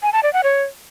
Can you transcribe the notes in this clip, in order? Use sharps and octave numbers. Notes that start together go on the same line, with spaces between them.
G#5
A5
D5
F#5
C#5